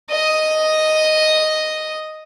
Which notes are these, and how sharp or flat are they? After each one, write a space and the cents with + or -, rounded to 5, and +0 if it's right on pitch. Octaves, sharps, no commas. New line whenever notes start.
D#5 +0 D#6 +0